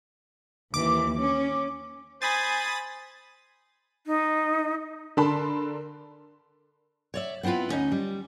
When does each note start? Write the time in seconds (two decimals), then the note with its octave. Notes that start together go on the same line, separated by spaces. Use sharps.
0.74 D#2 E3 D6
1.15 C#4
2.22 C5 G#5 B5 D#6 A6
4.06 D#4
5.17 D3 A#4 A5 B5 C6
7.14 C#5 D5 E5
7.43 B3 C4 E4 F4 B4
7.69 D2 C#4 D#4 D#5
7.92 G3